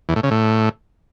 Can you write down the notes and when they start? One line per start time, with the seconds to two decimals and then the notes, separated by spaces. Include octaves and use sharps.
0.09 E2
0.16 A2
0.23 C#3
0.31 A2